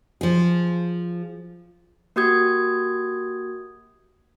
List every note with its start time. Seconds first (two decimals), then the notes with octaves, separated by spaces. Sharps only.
0.21 F3 G#4
2.16 A#3 F#4 G4 D#6 G6 G#6